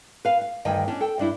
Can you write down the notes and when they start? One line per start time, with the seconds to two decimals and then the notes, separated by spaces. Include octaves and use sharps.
0.25 B4 F5
0.41 F5
0.65 D2 G2 D#3 G5 G#5
0.88 C#4 D4
1.01 A4 G5
1.18 G2 G3 D4 E4